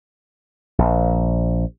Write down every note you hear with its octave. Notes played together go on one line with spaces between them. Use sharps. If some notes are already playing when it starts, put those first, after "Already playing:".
A#1